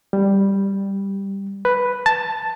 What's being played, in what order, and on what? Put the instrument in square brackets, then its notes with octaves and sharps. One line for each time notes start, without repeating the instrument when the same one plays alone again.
[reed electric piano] G3
B4
A5